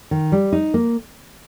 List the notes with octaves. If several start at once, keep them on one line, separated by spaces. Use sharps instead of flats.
D#3
G3
D#4
A#3